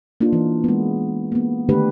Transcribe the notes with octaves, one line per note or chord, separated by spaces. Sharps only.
A#3 D4 D#4 F4
E3
G#3 B3
A#3 B3
D3 D#3 A3 D4 G4 B4